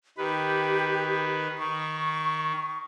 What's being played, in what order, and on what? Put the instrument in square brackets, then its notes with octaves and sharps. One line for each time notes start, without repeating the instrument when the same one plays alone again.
[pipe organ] D#3 B4 [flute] G4
[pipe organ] D#3 [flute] C#6